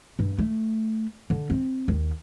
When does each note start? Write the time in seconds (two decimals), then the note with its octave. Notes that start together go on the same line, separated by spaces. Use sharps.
0.19 G2
0.38 A3
1.30 D3
1.50 C4
1.88 D#2